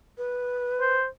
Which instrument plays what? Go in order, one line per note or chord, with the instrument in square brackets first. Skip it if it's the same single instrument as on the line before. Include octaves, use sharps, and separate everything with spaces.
[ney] B4
[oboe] C5